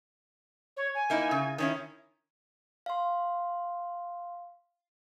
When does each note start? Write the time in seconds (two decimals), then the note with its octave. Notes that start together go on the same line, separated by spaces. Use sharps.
0.77 C#5
0.95 G#5
1.10 A#3 D#4 E4
1.31 C#3
1.58 D#3 C#4 E4
2.86 F5 C6